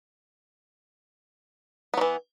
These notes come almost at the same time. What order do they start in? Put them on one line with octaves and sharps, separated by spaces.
B3 F#3 E3